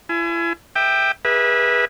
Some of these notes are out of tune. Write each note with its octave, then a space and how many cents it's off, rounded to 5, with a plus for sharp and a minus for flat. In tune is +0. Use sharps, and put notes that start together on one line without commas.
E4 +40 G#5 +20
E5 +0 G5 +0 D6 +40
G#4 -30 B4 -25 E5 -5